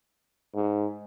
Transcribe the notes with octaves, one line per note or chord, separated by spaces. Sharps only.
G#2